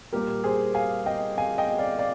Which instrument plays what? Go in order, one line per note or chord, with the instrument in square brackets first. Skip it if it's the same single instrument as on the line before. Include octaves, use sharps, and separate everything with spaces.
[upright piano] A#2 G3 A#3 G4 A#4
G#4 C5
F5 G#5
D#5 G5
F5 G#5
D#5 G5
D5 F5
D5 F5